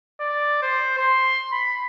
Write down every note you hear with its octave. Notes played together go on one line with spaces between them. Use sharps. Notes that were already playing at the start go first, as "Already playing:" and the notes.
D5
C5
C6
B5